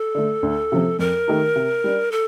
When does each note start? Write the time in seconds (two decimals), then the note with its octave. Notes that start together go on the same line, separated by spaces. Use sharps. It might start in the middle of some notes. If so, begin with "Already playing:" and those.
Already playing: A4
0.15 D3 A3
0.43 D2
0.72 C3 F3 C4
0.99 F2 A#4
1.27 D#3 A3 D#4 G4
1.56 C3
1.84 G3 D4
2.12 A4